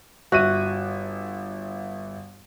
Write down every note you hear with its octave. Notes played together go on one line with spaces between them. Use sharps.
G1 F#4 E5 D#7